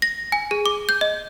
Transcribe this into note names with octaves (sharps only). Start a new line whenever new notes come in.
A#6
G#5
G#4
D6
G6
D#5